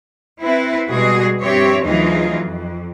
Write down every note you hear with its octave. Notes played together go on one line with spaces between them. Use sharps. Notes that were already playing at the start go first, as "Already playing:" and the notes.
C4 E4 B4
B2 G3 G#3 F#4 G#4
G2 F3 C4 G4 C#5 E5
D2 E3 F#3 D#4 F4 G#4
F2